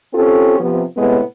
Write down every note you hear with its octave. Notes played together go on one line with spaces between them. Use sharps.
C4 C#4 F4 G4 A4
C3 F3 B3
A2 C3 G#3 B3